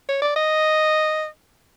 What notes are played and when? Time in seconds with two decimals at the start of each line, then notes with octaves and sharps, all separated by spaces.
0.09 C#5
0.22 D5
0.36 D#5